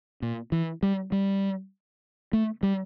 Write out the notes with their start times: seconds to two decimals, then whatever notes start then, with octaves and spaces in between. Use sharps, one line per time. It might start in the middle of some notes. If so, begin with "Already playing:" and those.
0.22 A#2
0.52 E3
0.83 G3
1.12 G3
2.33 A3
2.63 G3